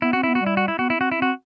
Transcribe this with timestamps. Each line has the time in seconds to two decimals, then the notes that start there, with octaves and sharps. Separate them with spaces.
0.02 B3 E4
0.13 C4 F#4
0.23 B3 E4
0.35 F#4
0.41 G3
0.47 E4
0.57 F#4
0.68 E4
0.79 B3 F#4
0.90 E4
0.98 C4 F#4
1.12 E4
1.18 C4 F#4